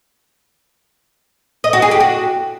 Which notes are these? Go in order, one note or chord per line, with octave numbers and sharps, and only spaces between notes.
D#5
F#4
G#4
G4
F#4